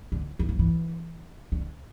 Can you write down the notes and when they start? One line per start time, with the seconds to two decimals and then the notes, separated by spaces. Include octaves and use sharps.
0.12 D3
0.39 E3
0.49 F3
0.59 E3
1.52 D3